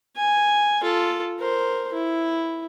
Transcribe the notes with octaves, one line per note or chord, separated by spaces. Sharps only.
G#5
F4 A4
A#4 C5
E4